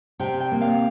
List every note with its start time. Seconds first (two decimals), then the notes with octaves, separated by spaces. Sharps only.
0.20 C3 G5
0.40 G5
0.52 A#3
0.61 F5